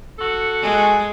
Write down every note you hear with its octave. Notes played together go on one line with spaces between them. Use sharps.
F#4 A4
G#3 G#5